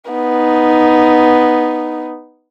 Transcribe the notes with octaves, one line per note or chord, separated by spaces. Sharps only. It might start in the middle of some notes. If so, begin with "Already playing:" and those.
B3 D#4